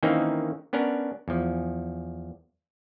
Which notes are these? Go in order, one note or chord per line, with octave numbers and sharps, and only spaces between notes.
D#3 E3 A#3 C4 C#4 D#4
B3 C#4 D4 A#4
E2 F3